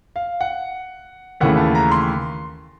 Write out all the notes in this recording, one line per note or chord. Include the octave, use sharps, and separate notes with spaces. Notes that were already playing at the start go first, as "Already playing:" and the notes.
F5
F#5
D#2 C#3 E3 A3 F#5
A5
A#5
C6